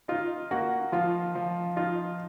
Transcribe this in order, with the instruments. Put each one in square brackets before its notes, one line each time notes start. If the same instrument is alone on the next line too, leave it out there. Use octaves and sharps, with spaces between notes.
[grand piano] D#4 [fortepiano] F4
[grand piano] A#3 [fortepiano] F#4
[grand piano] F3 [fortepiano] F4
[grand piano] F3
[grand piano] D#4 [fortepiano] F4